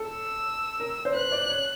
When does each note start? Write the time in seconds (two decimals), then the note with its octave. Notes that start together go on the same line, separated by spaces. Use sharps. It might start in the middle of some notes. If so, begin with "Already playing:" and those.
Already playing: A4
0.10 E6
0.80 A#4
1.05 C5
1.14 B4 F#6
1.32 D5
1.50 C#5